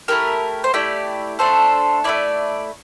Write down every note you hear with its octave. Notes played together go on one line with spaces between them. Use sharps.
A3 E4 G4 A#4
C5
A3 E4 G4 D5
A3 D4 A4 C5
A3 C4 E4 D5